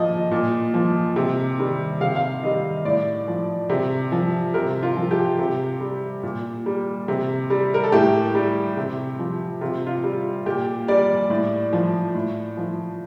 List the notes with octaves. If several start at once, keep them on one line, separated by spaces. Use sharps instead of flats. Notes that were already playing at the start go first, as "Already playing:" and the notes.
Already playing: A#2 F3 D#5
A#2
F3
C3
D#3 G3
C3 F5
F5
D#3 G3 D#5
A2 D5
F3
C3
F3
C3 A#4
F4
F3
G4
C3
G3
A#2
G3
C3
G3
A#4
A4
A2 G4
G3
C3
F3
C3 F4
F4
G3
A#2 G4
G3 D5
A2
F3
A2
F3